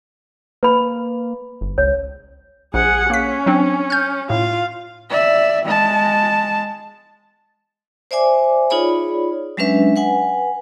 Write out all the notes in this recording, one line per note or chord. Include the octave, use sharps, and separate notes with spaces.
A#3 B4 B5
G1
C#2 C#5
A#1 G#4 F#5
A#3 C#4 B6
F#3 C4 D4
F6 G6
A2 F4 F5
D5 E5
G#3 A5
C5 D5 E5 G#5 D6
D#4 F4 G#4 C#5 D5 B5
F#3 G#3 C#4 D4 B4 E5
B4 F#5 G#5